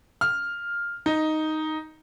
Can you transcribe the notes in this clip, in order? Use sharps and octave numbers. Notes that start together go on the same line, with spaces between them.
F6
D#4